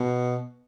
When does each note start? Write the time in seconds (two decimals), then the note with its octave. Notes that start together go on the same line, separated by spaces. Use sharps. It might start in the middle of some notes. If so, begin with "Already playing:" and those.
Already playing: B2